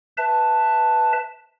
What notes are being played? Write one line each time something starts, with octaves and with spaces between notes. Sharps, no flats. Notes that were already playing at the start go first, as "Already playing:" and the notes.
B4 E5 A5